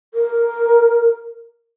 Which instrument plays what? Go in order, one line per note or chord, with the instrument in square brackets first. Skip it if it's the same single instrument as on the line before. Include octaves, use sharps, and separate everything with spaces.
[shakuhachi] A#4